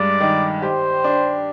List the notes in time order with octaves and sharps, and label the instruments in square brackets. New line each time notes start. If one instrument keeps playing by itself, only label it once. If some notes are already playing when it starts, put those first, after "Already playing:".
Already playing: [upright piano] G2 G#3 [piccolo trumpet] D5
[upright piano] D#3
[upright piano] G4 [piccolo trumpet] C5
[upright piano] D4